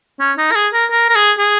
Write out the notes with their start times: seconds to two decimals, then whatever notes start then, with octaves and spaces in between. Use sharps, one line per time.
0.20 C#4
0.38 D#4
0.51 A#4
0.56 G#4
0.73 A#4
0.91 A#4
1.09 A#4
1.16 G#4
1.39 G#4